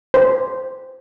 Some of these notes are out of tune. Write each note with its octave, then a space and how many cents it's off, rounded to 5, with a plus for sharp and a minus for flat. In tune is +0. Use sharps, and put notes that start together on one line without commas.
C5 -10